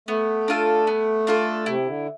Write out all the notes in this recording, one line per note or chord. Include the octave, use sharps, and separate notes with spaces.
A3 B3
D4 F4 A4
B3
D4 F4 A4
C3 E4
D3